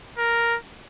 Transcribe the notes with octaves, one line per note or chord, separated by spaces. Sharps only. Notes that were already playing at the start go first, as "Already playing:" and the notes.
A#4